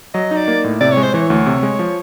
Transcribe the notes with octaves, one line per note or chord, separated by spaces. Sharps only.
F#3 D#5
D#4
D5
A#3
A2
C3 D5
C#5
G#3
C5
E3 C#5
D2
C3
G#3
F3